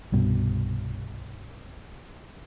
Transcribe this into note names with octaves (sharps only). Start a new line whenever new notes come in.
C2 G2 B2